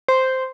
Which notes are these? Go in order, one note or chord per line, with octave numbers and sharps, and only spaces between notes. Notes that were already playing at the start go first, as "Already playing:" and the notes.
C5